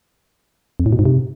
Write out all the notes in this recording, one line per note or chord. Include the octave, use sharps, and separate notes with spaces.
F2
A2
B2
G#2
C3